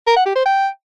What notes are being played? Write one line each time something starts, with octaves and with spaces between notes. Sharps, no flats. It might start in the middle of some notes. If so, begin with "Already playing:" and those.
A#4
F#5
G4
C5
G5